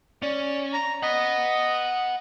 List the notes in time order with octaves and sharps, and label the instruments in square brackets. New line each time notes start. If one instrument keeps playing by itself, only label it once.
[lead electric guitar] C#4 [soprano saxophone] D5
[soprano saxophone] A#5
[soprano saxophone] D#5 [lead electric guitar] F#5 B5